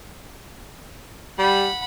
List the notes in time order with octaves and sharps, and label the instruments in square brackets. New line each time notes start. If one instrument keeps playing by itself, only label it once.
[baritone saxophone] G3 [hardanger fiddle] F#5 B5